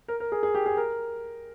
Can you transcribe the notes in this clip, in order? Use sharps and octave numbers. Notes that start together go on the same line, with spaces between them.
A#4
A#4
G#4
G#4
G4
G#4
A#4